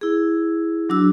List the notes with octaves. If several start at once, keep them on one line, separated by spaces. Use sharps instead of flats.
E4 G#4
F#3 D4 F#4 E6